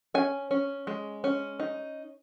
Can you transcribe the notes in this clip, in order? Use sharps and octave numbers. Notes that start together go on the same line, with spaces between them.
C#4 G#5
C#4
G#3
C#4
D#4